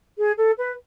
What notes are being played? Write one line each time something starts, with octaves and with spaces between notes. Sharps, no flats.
G#4
A4
B4